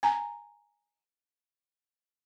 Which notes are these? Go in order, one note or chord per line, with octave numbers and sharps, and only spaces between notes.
G#5 A#5